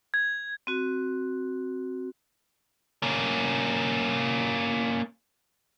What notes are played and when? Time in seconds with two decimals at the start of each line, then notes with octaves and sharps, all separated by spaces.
0.14 G#6
0.67 C4 F#4
3.03 A#3 C#4